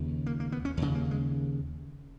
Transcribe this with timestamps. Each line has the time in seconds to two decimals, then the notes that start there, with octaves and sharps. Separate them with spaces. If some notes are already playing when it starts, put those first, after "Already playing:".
Already playing: D#2 C#3
0.26 A#3
0.40 A#3
0.52 B3
0.65 C#4
0.77 D#2 C#3
0.95 A#3
1.11 G#3